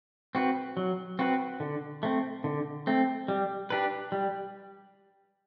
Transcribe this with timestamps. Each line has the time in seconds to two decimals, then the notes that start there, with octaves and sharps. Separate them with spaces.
0.35 C4 F#4 B4
0.77 F#3
1.19 C4 F#4 B4
1.60 D3
2.03 A3 C4
2.44 D3
2.87 A3 C4
3.28 G3
3.70 D4 G4 B4
4.12 G3